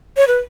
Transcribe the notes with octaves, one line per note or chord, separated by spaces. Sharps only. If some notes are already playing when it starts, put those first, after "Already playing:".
C#5
B4